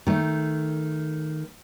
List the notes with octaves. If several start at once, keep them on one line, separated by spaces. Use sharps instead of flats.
D#3 A3